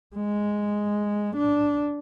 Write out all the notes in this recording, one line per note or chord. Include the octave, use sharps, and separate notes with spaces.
G#3
D4